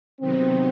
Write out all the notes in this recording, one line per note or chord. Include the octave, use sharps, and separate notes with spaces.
C3 D#3 F#3 B3 C4 D#4